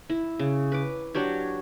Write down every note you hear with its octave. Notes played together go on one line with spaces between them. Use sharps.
E4
C#3
B4 D6
F#3 D4 G4 C#5